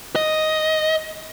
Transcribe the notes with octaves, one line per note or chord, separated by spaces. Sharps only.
D#5